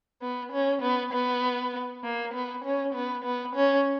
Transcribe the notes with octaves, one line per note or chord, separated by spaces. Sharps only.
B3
C#4
B3
B3
A#3
B3
C#4
B3
B3
C#4